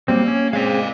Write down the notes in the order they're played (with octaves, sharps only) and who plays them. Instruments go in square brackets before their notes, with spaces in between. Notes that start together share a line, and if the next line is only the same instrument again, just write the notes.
[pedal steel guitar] F#3 G3 C4 [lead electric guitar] A#3
[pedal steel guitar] C#4
[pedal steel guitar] G#3 C4 [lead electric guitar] D5 F5